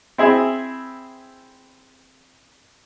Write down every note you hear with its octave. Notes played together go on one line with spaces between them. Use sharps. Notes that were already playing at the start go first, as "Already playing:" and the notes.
C4 E4 G#4